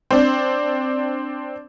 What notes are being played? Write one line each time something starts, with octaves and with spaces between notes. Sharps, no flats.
C4 D4